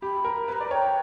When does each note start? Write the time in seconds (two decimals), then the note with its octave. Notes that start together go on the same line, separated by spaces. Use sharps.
0.02 G4 B5
0.25 A#4
0.48 B4 A#5 B5
0.60 D5
0.71 C#5 G5